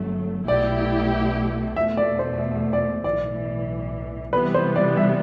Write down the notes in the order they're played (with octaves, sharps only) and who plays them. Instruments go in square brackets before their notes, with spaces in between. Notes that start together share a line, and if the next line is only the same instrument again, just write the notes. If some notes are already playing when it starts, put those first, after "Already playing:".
Already playing: [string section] G1 F#2 F#3 A3
[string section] B1 B2 A3 E4 G4 [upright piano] D5
[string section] E2 B2 A3 [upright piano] E5
[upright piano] D5
C5
D5
[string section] B1 A2 E3 [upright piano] D5
[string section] C3 E3 G3 B3 [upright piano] B4
[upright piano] C5
D5
E5